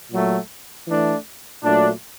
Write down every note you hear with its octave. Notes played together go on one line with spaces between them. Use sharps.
A#2 F#3 A3
E3 A3 D4
A#2 F#3 A3 D4